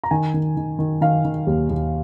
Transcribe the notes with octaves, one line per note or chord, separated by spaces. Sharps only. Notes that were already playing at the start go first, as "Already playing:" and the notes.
A#5
D#3 G#5
D#3
D#3
D#3
D#3 F5
D#3
D#2
D#2